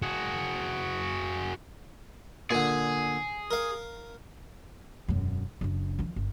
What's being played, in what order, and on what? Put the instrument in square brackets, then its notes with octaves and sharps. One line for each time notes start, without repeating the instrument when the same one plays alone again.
[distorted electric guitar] F#4 G#4
[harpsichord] A#2 D3 [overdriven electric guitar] G#4
[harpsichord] A#4 F5
[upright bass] E1 F#2
F#1 D4
D#3 F3
G1